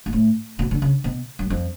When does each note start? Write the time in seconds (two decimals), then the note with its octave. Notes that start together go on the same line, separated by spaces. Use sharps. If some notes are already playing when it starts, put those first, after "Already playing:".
0.06 G#2
0.13 A2
0.59 B2
0.71 D3
0.82 C#3
1.04 B2
1.39 F#2
1.50 F2